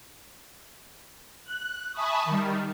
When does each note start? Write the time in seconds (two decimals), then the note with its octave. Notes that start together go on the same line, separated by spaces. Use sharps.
1.44 F#6
1.92 E5 G#5 A5 B5 C#6 D#6
2.25 D#3 G3